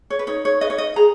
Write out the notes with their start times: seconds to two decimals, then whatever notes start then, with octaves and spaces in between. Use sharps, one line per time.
0.10 C#5
0.19 B4
0.27 D#4 C#5
0.45 C#5
0.61 B4 D#5
0.70 C#5
0.78 D#5
0.96 G#4 A#5